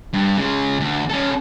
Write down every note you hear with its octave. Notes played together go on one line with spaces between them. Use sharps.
G2
C#3 G#3
D2
C#4 A4